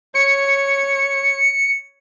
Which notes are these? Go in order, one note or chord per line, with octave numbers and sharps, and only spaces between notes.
C#5 C#7